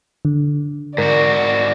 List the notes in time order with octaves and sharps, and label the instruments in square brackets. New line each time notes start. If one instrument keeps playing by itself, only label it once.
[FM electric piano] D3
[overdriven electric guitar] G#2 F#4 [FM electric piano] A#4 [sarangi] D5